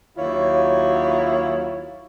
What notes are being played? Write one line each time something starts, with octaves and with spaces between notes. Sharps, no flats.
D#2 F#3 E4 F4 C#5